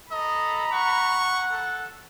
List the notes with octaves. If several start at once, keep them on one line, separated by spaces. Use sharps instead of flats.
A4 D#5 A#5 B5
F#5 C#6
A4